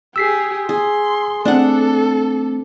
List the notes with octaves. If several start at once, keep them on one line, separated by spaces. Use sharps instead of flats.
G4 G#4 E6 B6 C7
G#4 C6
A3 C4 D4 A4 F#5